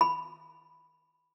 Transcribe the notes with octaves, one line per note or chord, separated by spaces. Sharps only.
B5